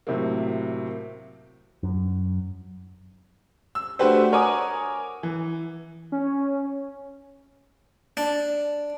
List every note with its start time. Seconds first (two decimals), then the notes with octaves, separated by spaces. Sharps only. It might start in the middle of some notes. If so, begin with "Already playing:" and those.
0.07 A2 C3 F#3 A#3
1.83 F#2
3.75 E6
3.99 A3 D4 F#4 G4 B4 C5
4.32 A#4 C#5 F#5 G#5 D6 D#6
5.23 E3
6.12 C#4
8.17 D4